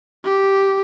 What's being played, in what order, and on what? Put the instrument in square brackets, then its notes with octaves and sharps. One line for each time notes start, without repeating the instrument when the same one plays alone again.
[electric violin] G4